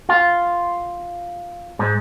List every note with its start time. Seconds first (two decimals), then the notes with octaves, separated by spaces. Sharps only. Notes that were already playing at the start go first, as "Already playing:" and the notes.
0.09 F4
1.79 G#2